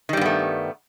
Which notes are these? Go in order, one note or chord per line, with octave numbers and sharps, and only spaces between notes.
G2 D#3 G3 A3 B3